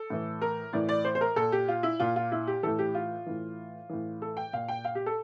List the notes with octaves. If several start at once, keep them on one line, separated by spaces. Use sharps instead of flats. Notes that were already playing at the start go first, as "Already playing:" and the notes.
Already playing: A4
A2 E3
A#4
A2 E3 D5
D5
C5
C5
A#4
A#2 A4
G4
F4
E4
A#2 F4
F4
E4
G4
A2 E3 A4
G4
F4
A2 E3
A2 E3
A4
G5
A#2 F5
G5
F5
G4
A4